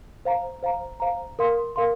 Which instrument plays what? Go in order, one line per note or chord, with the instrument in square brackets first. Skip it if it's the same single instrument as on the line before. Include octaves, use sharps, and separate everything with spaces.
[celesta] C5 F5 A#5
C5 F5 A#5
C5 F5 A#5
A#4 F5 C6
A#4 F5 C6